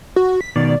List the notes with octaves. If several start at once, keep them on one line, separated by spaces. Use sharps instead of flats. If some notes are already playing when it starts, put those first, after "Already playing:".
F#4
B6
B2 D#3 D5